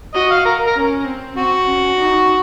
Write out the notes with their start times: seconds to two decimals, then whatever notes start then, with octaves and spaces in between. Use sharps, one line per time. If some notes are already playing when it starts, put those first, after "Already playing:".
0.14 F#4 D#5
0.31 F5
0.45 A#4
0.66 A#4
0.76 C#4
1.06 C4
1.36 C4 F#4
1.67 C#4
1.97 D#4